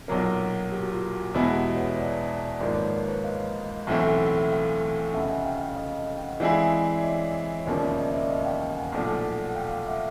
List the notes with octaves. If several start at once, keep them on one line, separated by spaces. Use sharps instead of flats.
B1 A#2 F#3 A#3 C4
G4
F#4
F4
F#4
E2 B2 G#3 B3 E4
F#4
G4
B4 C#5
C5 D5
G#1 G#2 F3 A#3 C5 D5
B4 C#5
A#4 C5
C5
B4 C#5
D#5 F5
B1 A2 E3 A3 C4 E5 F#5
F5 G5
F1 F2 C#3 E5 F#5
F#5 G#5
F5 G5
F5 G5
D#5 F5
G5
F#5
F5
E3 G#3 C4 E4 G#4 D5 E5
D5
C#5 D#5
C#5
E1 D#2 C#3 F3 A#3 C5 D5
D5 E5
D#5 F5
D5 E5
D#5 F5
F5 G5
F5 G5
F#5 G#5
B1 A#2 F3 A3 D4
F#5
F5 G5
F5 G5
E5 F#5